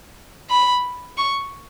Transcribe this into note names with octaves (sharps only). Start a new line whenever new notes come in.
B5
C#6